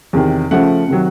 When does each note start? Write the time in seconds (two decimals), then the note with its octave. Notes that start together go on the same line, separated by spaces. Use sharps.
0.13 E2 C3 D#3
0.51 C#3 F3 A3 F#5
0.88 C3 D#3 F#3